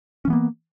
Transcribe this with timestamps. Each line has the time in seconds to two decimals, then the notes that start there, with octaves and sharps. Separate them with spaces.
0.25 C#4
0.28 E3
0.30 B3
0.33 A#3